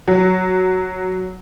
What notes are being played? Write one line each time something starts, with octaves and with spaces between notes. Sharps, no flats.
F#3